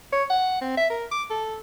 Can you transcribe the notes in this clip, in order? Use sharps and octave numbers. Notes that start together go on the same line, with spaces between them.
C#5
F#5
C4
E5
A#4
D6
A4